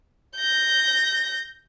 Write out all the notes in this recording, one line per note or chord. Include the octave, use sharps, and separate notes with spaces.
G6 A#6